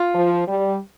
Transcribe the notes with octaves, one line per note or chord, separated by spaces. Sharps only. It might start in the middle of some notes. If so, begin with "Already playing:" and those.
Already playing: F4
F3
G3